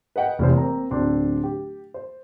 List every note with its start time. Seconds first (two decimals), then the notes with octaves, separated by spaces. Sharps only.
0.16 B4 D#5 F#5 G5
0.39 F1 E3 C5
0.54 A#3 C4 A#5
0.90 D1 C4 D4 C6
1.44 G4
1.94 C5